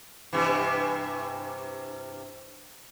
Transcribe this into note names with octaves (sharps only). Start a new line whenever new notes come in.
G2 C3 E3